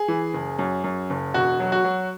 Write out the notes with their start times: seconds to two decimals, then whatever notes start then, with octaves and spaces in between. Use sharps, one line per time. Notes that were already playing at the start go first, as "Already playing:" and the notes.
Already playing: G#4
0.08 E3
0.34 F#1
0.59 F#2
0.84 F#2
1.10 F#1
1.34 E1 F#4
1.60 F#3
1.72 F#4
1.84 F#3